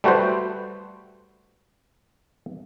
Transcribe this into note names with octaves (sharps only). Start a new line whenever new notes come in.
G3 A3 F#4 B4 C5